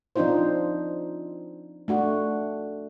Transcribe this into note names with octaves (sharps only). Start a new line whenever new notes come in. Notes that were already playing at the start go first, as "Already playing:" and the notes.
F3 C4 D4 D#4 F4 C5
A3 D4 F#4